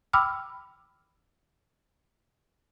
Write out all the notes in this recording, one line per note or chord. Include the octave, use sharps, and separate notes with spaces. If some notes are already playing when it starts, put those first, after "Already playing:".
G5 B5 D6 E6 F6